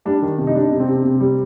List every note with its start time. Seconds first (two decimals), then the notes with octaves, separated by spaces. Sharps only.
0.05 G3 D4
0.22 D#3
0.38 C3
0.47 D#4
0.55 G3 D4
0.71 C3
0.80 C4
0.88 C3
1.04 C3
1.20 G3